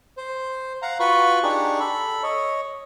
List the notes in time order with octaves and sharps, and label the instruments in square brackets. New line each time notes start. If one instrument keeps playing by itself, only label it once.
[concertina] C5
F5 F#5 A#5
F4 F#4 B4 B5 C#6
D4 D#4 G4 G#4 C#6
A4 B5
C#5 D#5